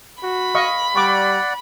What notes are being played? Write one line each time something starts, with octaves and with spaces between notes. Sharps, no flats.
F#4 B5
D#5 F5 C#6
G3 D5 F#5 C#6 D6